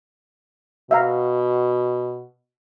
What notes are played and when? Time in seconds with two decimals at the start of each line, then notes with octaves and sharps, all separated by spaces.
0.91 B2 E5 F5 A#5